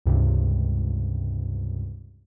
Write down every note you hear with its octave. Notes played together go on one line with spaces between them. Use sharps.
C#2 G2 C3